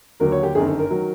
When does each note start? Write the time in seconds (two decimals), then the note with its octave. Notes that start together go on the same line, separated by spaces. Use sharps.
0.20 D#2 D3 F#3 A#4
0.32 C#5
0.43 G4
0.55 G1 F#2 D#3 G#4
0.67 A4
0.79 A#4
0.90 D#3 F#3